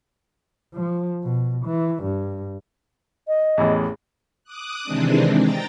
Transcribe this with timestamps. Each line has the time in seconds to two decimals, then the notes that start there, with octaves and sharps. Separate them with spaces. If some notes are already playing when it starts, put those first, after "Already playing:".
0.74 F3
1.24 B2
1.66 E3
2.03 G2
3.28 D#5
3.58 A1 E2
4.44 D6 D#6 F#6
4.84 C3 D#3 E3 G#3 C4 D4
5.36 G5 A#5 A6